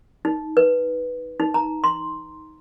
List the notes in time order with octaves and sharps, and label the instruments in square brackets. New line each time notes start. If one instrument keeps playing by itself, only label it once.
[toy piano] D#4
B4
D#4
A#5
C6